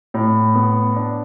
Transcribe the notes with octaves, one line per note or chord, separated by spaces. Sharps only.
A2
B3
D4